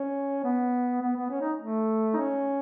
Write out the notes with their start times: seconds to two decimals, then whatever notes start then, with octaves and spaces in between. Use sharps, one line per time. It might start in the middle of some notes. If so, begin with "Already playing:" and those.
Already playing: C#4
0.44 B3
1.02 B3
1.17 B3
1.30 C#4
1.41 D#4
1.60 A3
2.14 D#4
2.17 C#4